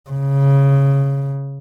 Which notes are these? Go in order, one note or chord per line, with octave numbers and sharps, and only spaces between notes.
C#3